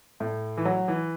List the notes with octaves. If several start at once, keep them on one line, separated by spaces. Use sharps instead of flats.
A2
E3
F#3
E3